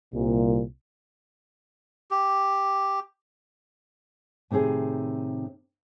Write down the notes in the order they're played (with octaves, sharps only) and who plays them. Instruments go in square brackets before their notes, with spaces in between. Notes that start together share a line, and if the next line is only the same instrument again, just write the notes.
[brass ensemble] C2 A#2
[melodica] G4
[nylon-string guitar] A2 C3 D#3 C4 G#4